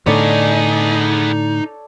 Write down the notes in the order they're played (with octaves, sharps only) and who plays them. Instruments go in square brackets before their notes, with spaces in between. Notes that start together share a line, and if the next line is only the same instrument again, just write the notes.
[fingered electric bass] A2 D3 [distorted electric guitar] B3 G#4 [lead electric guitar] D#4 [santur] A4 C#5 D5